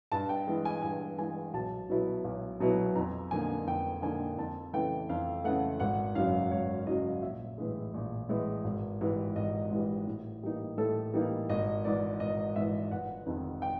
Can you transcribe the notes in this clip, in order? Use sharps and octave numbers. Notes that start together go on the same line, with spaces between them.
G2 A5
G5
E3 G#3
G#5
G2 G#5
E3 G#3 G#5
B1 A5
B2 F#3 B3 E4
B1
B2 F#3 B3 E4
F2 A#5
D3 F3 A#3 D#4 G#5
F2 G5
D3 F3 A#3 D#4 G#5
F2 A5
C#3 E3 A3 G5
F2 F5
C#3 E3 A3 F#5
G#1 F#5
F#2 C#3 F#3 F5
G#1 C#5
F#2 C#3 F#3 D#5
A#1 E5
A2 E3 G#3
A#1
A2 E3 G#3
G#1
G#2 E3 G3
G#1 D#5
G#2 E3 G3
A2
E3 G3 A#3 D#4
A2 A4
E3 G3 A#3 D#4
G#1 D#5
G#2 E3 D5
G#1 D#5
G#2 E3 E5
G1 F#5
F2 C3 D#3
G5